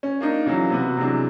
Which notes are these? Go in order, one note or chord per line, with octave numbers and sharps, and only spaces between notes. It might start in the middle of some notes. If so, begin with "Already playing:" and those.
C#4
A#3 D4 D#4
C#3 E3 F#3
C3 B3 F#4
C3 E3 F#3 G#3 D4